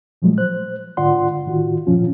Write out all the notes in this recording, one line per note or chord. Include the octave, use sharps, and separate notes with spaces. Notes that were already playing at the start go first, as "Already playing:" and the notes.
A#2 F3 F#3 G#3 A3
C5 F#6
G#2 D3 F4 D5 F#5 C6
A2 D#3 F4 F#4
G2 A#2 F3 C#4 F4